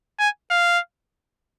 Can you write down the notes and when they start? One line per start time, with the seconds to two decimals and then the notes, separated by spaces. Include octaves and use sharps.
0.19 G#5
0.51 F5